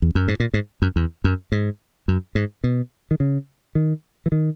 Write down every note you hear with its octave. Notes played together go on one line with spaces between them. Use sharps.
E2
F#2
G#2
A#2
G#2
F#2
E2
F#2
G#2
F#2
G#2
B2
D#3
C#3
D#3
E3
D#3